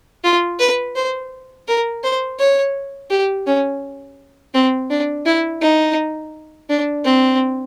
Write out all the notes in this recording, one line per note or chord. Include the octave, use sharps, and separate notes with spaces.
F4
B4
C5
A#4
C5
C#5
G4
C#4
C4
D4
E4
D#4
D4
C4